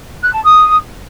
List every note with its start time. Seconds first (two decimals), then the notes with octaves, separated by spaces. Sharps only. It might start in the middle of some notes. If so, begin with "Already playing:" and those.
0.23 F#6
0.33 A5
0.44 D#6